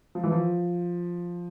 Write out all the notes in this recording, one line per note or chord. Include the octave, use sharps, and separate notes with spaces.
F3
E3
F3